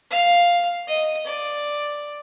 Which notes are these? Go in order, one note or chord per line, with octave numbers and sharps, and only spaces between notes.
F5
D#5
D5